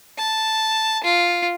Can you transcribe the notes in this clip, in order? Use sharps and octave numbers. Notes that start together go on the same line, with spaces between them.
A5
F4